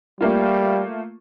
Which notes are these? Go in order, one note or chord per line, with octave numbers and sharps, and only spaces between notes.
G3 A3 A#3 F4